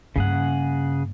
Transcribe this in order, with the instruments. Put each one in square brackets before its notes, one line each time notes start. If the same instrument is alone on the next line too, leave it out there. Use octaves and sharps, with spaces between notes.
[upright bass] G2 A#3 [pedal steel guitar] C#3 G#4 F#5